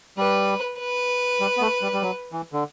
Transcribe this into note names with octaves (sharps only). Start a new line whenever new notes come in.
G3 B4
B4
G3
B3
A3
G3
G3
F#3
E3
D3